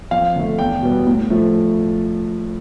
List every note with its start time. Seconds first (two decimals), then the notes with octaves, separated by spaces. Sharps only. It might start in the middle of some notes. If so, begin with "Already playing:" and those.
0.11 F2 F5
0.36 D3 A3
0.58 E2 G5
0.82 B2 G3 B3
1.07 A2
1.30 F3 A3